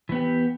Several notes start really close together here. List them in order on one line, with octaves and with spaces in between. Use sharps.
E3 B3 G4